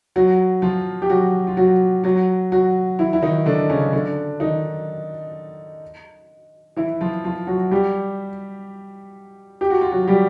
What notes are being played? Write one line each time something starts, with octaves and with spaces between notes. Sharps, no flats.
F#3 F#4
F3 F4
G4
F#3 F#4
F4
F#3 F#4
F#3 F#4
F#3 F#4
E3 E4
E4
D#3 D#4
D3 D4
C#3 C#4
D3 D4
D#3 D#4
E3 E4
F3 F4
F3 F4
F#3 F#4
G3 G4
G4
F#4
F4
F#3 F#4
G3 G4